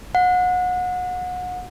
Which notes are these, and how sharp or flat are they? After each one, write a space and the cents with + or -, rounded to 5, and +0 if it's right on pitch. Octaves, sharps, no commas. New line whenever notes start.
F#5 -30